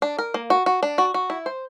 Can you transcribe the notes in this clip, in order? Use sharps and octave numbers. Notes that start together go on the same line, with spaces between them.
D4
A#4
A#3
F#4
F#4
D4
F#4
F#4
E4
C5